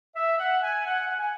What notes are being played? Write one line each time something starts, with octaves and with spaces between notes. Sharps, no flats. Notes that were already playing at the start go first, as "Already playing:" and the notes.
E5
F#5
G#5
F#5
F#5
G#5